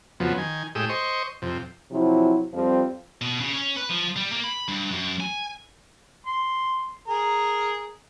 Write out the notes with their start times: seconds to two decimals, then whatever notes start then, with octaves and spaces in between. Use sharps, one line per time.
0.20 F2 C#3 F3 F#3 B3
0.38 D#3 G#5
0.75 A2 G#3 G4 D#6 E6
0.89 C5 D#5 C#6
1.42 F2 C3
1.91 C3 F3 F#3 E4
2.54 F2 F3 G3 C4 F4
3.22 B2
3.40 C#3
3.53 C#4
3.76 B4
3.90 F3
4.16 G3
4.32 A#3
4.44 B5
4.68 G2
4.91 F#2
5.20 G#5
6.26 C6
7.08 G#4 A#4